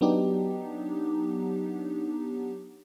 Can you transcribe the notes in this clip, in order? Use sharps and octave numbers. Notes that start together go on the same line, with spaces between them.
F#3 B3 D4 D#4 G4